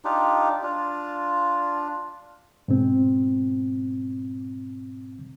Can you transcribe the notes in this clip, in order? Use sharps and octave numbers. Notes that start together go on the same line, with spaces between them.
D4 D#4 F4 G4
D4 F4
G#2 B2 C4